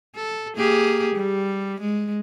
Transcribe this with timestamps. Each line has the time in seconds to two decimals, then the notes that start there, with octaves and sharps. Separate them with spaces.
0.16 A4
0.57 A#3 G4 G#4
1.15 G3
1.81 G#3